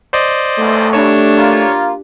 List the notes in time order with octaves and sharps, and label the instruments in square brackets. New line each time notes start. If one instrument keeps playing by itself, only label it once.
[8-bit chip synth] C5 D5 D#5
[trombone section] B1 E2 [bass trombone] A3
[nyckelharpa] D4 G4 [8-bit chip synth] C#5
[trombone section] A#3 F4